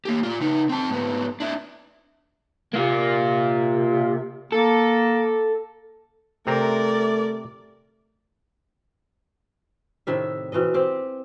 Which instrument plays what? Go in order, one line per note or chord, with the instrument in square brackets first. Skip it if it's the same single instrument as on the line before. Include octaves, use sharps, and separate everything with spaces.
[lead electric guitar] A#3 G4
F4 D5
C#3 D#4
C4 A5
G#2 B3
D4 E4
[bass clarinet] C3 [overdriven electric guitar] A#3 F4
[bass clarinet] A#3 [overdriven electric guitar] A4
[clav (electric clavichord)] C3 C4 A#5 [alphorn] A3 [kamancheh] A#4 D5
[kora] A2 C3 D#3 E5
B2 E3 C4 D#5
C4 G4